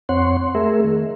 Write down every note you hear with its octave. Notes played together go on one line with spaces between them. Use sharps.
F2 C4 C#5 F#5 C6
A3 G#4 A#4 E5
D#3